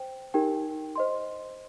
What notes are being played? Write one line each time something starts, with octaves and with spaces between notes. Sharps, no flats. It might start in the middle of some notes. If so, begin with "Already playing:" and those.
Already playing: C5 G5
D#4 G4 A#4 G5
C5 D#5 C6